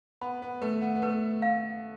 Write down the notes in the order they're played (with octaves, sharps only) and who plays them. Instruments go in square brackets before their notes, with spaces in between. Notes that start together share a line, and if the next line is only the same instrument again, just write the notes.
[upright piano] B3 [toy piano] B5
[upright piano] B3
[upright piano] A3 [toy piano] B4
[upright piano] B3
B3
[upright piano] A3 [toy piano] B4
[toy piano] F5